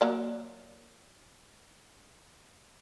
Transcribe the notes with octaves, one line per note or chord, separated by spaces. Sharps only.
F#3 A#3 D5